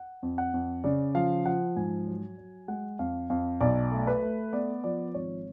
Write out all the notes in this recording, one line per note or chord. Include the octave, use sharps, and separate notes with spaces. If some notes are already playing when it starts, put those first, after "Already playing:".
Already playing: F#5
F2
F#5
F2
C#3 D5
F3 F5
F3 F#5
G#2 G#5
F#3
F#3
G#3 F#5
F2 F5
F2 F5
B1 D5
A3
B4
A3
B3 D5
F3 D5
G#1 C#5